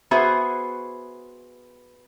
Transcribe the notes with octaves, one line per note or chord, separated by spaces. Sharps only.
B3 F#4 G#4 C5 E5